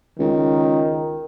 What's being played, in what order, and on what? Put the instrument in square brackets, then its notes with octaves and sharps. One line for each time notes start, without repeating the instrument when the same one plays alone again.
[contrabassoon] C#2 [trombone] D#3